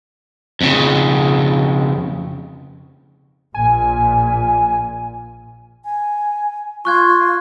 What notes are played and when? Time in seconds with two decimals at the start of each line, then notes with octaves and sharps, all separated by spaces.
0.61 F2 C#3
3.54 A#1 A#2 G#5
5.85 G#5
6.85 F4 C#6 F#6 G#6